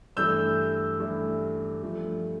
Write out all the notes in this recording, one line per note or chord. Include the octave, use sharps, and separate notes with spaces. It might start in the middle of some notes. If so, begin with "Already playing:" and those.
G2 E3 A3 E6 G6
G2 E3 A3
G2 F3 A3